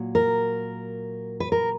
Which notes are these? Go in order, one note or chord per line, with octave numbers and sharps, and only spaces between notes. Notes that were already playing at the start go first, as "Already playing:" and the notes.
Already playing: A#2 F#3
A#4
B4
A#4